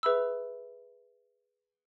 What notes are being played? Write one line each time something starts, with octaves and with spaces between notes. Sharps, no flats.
G#4 B4 E5 B5 E6